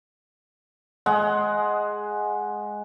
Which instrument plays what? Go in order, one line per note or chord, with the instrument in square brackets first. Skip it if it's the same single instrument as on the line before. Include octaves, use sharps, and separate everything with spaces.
[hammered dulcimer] G#3 D#5 F#5